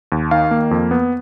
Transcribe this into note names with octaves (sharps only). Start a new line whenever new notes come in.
D#2
D#3 F5
A#3
F2
B3